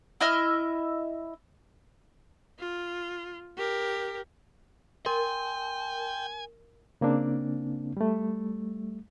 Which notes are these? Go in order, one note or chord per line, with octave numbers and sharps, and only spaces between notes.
E4 D#5 E5 F6
F4
G4 A#4
A#4 G5 G#5 C6
C#3 A#3 C4 D4
G3 A3